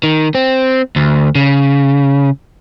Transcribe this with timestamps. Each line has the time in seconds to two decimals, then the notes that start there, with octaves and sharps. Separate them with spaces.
0.04 D#3
0.35 C4
0.96 D2
1.35 C#3